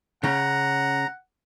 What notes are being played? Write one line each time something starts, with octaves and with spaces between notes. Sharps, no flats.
C#3 C#4 F#5 A#5